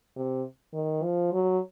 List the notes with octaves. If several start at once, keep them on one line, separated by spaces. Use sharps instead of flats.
C3
D#3
F3
F#3